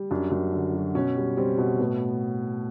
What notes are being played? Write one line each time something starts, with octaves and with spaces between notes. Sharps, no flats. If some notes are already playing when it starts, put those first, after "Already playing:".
Already playing: G3
F#2 D4
F#2
D3
F#3
B2 C#4
G3
G3 C4
B2
A2 B3